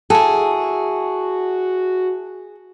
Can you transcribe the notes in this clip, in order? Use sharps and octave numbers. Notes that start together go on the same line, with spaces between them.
E4 F#4 G#4 A4